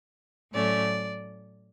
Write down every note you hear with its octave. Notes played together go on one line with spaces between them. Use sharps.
A2 F#3 A3 C#4 D5